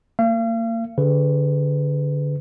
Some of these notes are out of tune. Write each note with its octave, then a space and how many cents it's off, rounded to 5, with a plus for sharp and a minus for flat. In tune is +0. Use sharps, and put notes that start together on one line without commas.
A#3 -30 F5 -40
D3 -15 G#4 +0 B4 +20